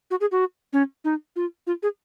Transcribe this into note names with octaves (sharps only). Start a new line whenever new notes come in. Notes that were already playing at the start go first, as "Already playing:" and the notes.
F#4
G#4
F#4
C#4
D#4
F4
F4
G#4